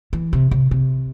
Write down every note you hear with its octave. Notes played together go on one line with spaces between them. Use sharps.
E3
C3
C3
C3